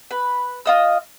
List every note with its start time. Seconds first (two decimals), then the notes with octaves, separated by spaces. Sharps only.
0.11 B4
0.66 F4 D#5 E6